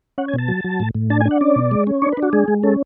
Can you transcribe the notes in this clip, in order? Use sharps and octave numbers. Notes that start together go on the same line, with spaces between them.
C#4 F#5
G#5
B2
A5
F#3
F#3
A2
A2
D4 A5
G#5
D4
F#5
C#4 D5
B2
G#3
C#4
D4 C#5
B4
D4
F#4
G#3 G#4
G#3
C#4 A4